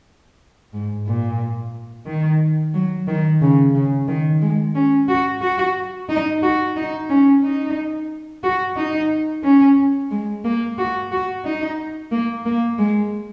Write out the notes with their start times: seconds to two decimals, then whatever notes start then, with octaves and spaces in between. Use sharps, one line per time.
0.73 G#2
1.07 A#2
2.07 D#3
2.74 F#3
3.08 D#3
3.41 C#3
3.75 C#3
4.08 D#3
4.42 G#3
4.75 C#4
5.09 F#4
5.41 F#4
6.09 D#4
6.43 F#4
6.76 D#4
7.10 C#4
7.44 D#4
8.43 F#4
8.77 D#4
9.44 C#4
10.11 G#3
10.45 A#3
10.78 F#4
11.12 F#4
11.45 D#4
12.12 A#3
12.46 A#3
12.79 G#3